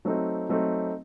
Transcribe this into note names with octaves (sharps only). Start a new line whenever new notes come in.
F#3 A3 C4 D#4
F#3 A3 C4 D#4